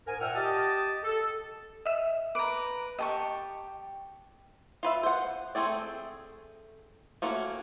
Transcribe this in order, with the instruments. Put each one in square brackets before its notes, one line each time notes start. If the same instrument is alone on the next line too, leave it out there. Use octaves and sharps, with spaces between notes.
[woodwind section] G#2 A#4 G#5
A#2 E5 F#5 G5 E6 F6
G4 D#5 A5 D#6
A4
[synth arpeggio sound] D#5 E5
[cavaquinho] B4 A#5 [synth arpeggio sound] D6 D7
[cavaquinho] G4 A5 C#6 [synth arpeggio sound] D#5
[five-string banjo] F4 B4 E5
C5 F#5
A3 C4 G#4 D5
A3 A#3 C#4 F#4